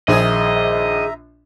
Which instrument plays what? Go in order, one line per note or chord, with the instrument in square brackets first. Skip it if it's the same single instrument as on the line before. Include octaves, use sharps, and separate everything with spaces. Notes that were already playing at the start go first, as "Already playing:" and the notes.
[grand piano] A#1 [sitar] D#3 G#4 [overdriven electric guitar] D#5 [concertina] E5 A#5